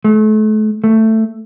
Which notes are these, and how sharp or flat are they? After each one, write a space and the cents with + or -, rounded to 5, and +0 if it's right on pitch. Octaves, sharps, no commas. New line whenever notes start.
A3 -35
A3 +10